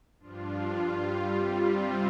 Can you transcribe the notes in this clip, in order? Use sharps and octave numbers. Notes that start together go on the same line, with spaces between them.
G2 F3 D4 F4
G2 G3 F4
C3 G3 C4 F4